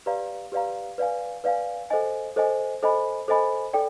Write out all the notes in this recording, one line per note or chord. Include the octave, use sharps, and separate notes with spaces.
G4 B4 D5 F5 A#5
G4 B4 D5 F5 A#5
B4 D5 F5 G#5
B4 D5 F5 G#5
A4 C5 D#5 G#5
A4 C5 D#5 G#5
A4 C5 D#5 G#5 B5
A4 C5 D#5 G#5 B5
A4 D5 G5